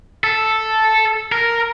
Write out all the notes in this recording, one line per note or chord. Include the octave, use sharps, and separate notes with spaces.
A4
A#4